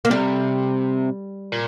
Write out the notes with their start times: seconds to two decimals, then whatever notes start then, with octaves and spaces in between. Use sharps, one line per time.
0.05 A#3
0.10 C3 G3
1.52 A#2